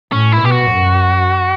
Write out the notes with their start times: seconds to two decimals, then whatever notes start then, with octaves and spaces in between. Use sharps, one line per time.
0.12 A2 C#4
0.32 E4
0.41 B2 G4
0.52 F#4
0.71 F#2